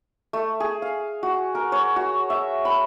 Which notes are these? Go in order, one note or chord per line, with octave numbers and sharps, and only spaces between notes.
A3
G#4
F5
F#4
A#4
C#5
F#4
E5
B5